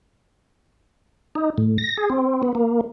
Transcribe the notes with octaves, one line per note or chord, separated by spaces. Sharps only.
D#4
A2
A#6
G#4
C4
B3
A#3